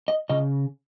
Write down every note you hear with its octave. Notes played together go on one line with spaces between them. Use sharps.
D#5
C#3 D#5